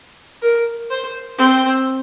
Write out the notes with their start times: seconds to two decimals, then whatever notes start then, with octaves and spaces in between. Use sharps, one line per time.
0.42 A#4
0.90 C5
1.38 C4